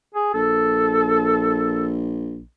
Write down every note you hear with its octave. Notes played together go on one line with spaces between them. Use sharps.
G#4
A#1 A4